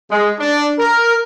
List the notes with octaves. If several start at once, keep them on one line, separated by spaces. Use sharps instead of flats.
G#3
D4
A#4